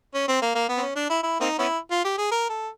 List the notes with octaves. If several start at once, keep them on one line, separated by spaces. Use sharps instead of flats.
C#4
C4
A#3
A#3
B3
C4
C#4
D4
E4
E4
A#3 C4 D#4
B3 C#4 E4
F4
G4
G#4
A#4
A4